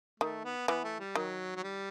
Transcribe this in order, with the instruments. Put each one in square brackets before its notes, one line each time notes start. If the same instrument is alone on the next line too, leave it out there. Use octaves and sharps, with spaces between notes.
[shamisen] D#3 [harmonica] A3
[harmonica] B3
[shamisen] E3 [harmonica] B3
[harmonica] A3
G3
[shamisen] D#3 [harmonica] F#3
[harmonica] F#3
G3